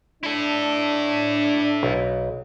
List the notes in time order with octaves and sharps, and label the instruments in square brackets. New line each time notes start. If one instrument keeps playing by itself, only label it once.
[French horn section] D4 [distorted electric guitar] E4 A4
[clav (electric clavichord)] B1